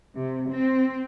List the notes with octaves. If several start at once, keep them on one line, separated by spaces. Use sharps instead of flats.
C3
C4